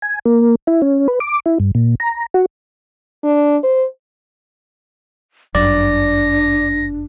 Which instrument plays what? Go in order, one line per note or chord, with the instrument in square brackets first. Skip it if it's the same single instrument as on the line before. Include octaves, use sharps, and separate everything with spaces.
[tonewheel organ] G#5
A#3
E4
C#4
B4
D6
E4
G2
A#2
A#5
F#4
[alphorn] D4
C5
[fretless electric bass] G1 F#2 [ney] D4 [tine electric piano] D5 [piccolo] A#6